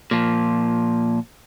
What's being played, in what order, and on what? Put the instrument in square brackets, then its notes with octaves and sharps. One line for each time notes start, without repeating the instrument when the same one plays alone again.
[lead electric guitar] A#2 F3